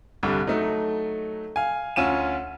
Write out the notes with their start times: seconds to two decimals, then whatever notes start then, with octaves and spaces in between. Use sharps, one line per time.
0.23 C2 G2 D3 G3
0.47 F#3 A3 D#4
1.56 F5 G#5
1.96 D2 C#4 F4 D#7 E7